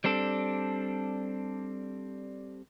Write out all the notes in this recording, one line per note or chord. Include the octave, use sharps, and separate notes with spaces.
G3 C4 D4 A4